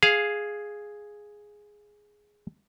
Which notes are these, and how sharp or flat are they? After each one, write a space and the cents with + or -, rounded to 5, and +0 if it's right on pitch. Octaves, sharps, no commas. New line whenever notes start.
G#4 +0 F5 +0